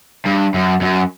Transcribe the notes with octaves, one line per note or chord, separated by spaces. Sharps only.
G2
F#2
F#2